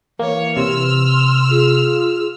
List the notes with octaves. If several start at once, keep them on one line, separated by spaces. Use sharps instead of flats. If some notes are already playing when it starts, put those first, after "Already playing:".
E3 A#3 C#5
C3 C6 E6 F6
F4 G#4